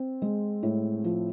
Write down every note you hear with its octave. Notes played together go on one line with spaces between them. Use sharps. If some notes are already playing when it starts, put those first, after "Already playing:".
Already playing: C4
G#3
A2
F3